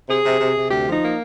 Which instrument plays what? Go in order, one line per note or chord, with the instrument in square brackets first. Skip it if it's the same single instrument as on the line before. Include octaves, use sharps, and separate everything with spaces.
[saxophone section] C3 G#4
C3
C3
C3
D2 G4
F3
D#4
A#3